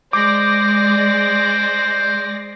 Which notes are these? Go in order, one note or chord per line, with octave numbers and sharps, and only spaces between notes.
G#3 C5 D5 D6 A#6